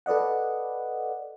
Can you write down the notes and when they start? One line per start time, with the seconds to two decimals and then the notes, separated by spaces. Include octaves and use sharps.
0.06 A4 B4 D5 D#5 F#5